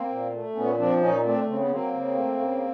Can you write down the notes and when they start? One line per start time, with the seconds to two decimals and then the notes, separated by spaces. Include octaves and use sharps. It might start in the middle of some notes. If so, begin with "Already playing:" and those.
Already playing: A#3 C4
0.09 A#2
0.33 A3
0.55 A#2 B3 C#4
0.78 F3 C4 D4
1.01 A#2 C#4 D#4
1.24 A3 C4 D4
1.47 C#3 C4
1.59 B3
1.69 F#3 A#3 C4
1.92 C#3
2.15 A3
2.37 C#3